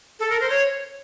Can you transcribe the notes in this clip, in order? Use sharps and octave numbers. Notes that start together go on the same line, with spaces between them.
A4
A#4
C5
C#5